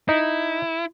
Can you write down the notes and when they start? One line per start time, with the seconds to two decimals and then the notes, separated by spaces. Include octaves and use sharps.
0.09 D#4 E4